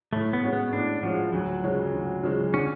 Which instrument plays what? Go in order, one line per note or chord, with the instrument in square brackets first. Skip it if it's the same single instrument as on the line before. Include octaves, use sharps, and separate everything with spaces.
[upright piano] A2 [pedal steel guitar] A3
[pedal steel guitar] B3
[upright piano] G#3 C#4 F#4
[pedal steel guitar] B3
[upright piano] A2 [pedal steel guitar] D4
[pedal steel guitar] F3 [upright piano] G#3 C#4 F#4
[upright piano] D2 [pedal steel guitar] F#3
[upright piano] C#3 F3 G#3 C#4
D2
C#3 F3 G#3 C#4
[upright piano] D3 [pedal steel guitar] C#4